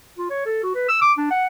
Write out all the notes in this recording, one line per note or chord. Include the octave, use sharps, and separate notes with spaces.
F4
C#5
A4
F#4
B4
E6
D6
D4
F#5